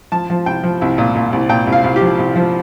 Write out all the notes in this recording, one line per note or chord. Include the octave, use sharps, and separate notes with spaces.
F3 A5
F3
C2 G5
F3
C2
A#2
A#2
C2
A#2 G5
C2
F5
C2
G4
F3
C2
F3